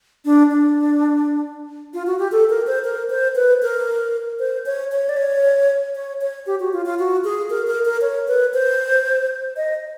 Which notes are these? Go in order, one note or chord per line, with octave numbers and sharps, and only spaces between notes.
D4
D4
F4
F#4
G4
A4
A#4
C5
A#4
C5
B4
A#4
C5
C#5
C#5
D5
C#5
C#5
C#5
G4
F#4
F4
F4
F#4
G#4
A#4
A#4
A#4
C#5
B4
C5
D#5